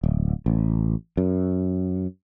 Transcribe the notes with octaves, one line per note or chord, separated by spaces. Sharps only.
D1
A1
F#2